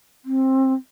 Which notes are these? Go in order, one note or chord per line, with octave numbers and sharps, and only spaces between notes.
C4